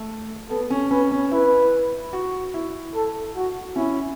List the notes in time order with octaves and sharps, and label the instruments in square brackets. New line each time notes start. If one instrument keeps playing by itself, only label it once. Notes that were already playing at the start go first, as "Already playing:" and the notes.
Already playing: [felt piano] A3
[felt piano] B3 [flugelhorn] A4
[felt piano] C#4
[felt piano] C#4 [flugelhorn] B4
[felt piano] C#4
[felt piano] E4 [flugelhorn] B4
[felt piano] F#4
E4
[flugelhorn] A4
F#4
[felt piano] C#4 [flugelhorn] E4